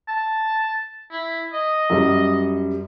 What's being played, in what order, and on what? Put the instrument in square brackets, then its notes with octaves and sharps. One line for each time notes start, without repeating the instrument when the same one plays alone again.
[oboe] A5
E4
D#5
[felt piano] F#2 G3